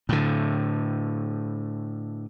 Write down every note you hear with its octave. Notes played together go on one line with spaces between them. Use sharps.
A2 D3